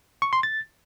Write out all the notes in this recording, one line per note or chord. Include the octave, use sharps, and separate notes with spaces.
C#6
C6
A6